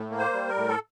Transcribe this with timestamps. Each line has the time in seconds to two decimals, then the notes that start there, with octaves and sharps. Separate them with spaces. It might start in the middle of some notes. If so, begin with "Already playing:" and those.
Already playing: A2
0.10 A#3
0.18 C5
0.33 G3
0.49 A#4
0.56 A2
0.68 A4